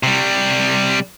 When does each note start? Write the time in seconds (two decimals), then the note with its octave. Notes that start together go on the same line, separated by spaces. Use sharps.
0.03 C3 G3